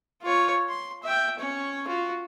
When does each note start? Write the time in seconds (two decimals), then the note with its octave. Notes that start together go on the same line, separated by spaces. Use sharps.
0.22 F4 C#5
0.69 C6
1.03 E5 G5
1.39 C#4 C#5
1.87 F4 F#4